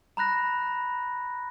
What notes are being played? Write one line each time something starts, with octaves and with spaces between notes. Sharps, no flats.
A#5 B5 F#6 A#6